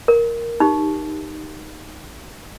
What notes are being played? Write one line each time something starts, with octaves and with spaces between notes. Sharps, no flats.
A#4
D#4 G4